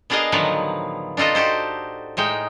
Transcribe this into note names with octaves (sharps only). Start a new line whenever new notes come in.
B3 D4 G#4 A#4 D#5 F5
A2 D3 D#3 F3 F#3 B3
D4 D#4 F4 A4 D#5
F#4 G4 A4 C5
A2 G#3 D#4 G5